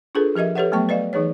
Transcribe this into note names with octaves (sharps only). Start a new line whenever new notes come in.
D4 F4 G#4 A4 B4
F3 G4 A#4 D#5 E5
G4 A4 B4 C#5 E5 F#5
F#3 A3 B3 G5 C#6
B4 D5 D#5 F5
E3 D#4 G#4 B4 C#5